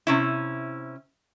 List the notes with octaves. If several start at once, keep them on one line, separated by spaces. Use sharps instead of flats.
C3 C#4 E4